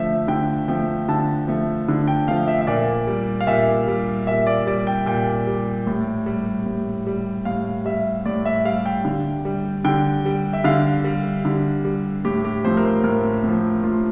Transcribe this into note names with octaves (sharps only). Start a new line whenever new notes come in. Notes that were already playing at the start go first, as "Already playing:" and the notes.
Already playing: D3 F3 A3 E5
D3 G5
F3 A3 G5
D3 A5
F3 A3
D3
G5
F3 A3 F5
E5
E5
A#2 D5
G3
F5
A#2 E5
G3
A#2 E5
D5
G3 D5
G5
A#2 G5
G3
A2
G3
A2
G3
A2 F5
G3 E5
A2 D5
E5
G3 F5
G5
D3
G3
D3 G5
G3
E5
D3 F5
G3
D3
G3
A2 G4
G4
F3 A3 C5
A#4
C5
A2 A#4
F3 A3
A2 F4